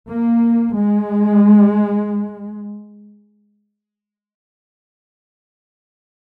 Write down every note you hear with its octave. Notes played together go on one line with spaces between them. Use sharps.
A#3
G#3